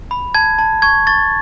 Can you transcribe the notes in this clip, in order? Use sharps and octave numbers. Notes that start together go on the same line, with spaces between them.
B5
A5 G#6
A5
C#6 G#6
C#6 A6